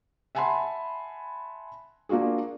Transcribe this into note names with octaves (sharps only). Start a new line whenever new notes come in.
E5 F#5 G#5 A5 B5 C6
A#3 D4 F4 F#4 G#4